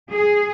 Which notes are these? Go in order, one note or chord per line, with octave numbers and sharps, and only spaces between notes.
G#4